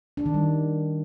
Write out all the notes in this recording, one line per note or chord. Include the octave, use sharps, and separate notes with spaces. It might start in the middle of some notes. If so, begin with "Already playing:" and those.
D4
D#3
G3